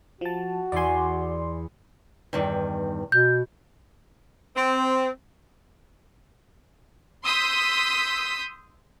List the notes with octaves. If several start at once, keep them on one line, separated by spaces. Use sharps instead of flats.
F3 F#4 A5
E2 E4 D5 G#5 C6
E2 G2 D#3
B2 G6
C4
C6 D#6 E6 G6 B6